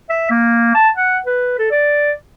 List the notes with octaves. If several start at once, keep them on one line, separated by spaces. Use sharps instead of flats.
E5
A#3
A5
F#5
B4
A4
D5